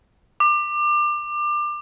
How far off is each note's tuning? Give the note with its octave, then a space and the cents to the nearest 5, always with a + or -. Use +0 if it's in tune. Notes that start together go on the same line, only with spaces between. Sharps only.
D6 +25